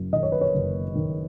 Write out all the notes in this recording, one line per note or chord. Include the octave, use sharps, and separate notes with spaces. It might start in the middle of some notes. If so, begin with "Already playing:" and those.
Already playing: F#1 F#2
D#3 D#5
C#5
B4
C#5
F#1
D#3